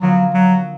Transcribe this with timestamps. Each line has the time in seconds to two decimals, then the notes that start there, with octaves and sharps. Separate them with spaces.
0.01 D3 F3 F#3 B3 F4 A#4
0.34 F#3